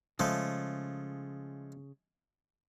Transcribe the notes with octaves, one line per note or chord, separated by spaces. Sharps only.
C#3 F3 G#3 A3